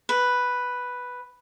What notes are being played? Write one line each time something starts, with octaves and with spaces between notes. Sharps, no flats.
B4